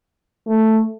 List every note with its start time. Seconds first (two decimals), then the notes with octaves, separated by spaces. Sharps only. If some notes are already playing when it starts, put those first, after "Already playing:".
0.47 A3